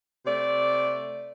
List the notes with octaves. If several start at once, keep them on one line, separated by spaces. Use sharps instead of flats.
C3 A3 D5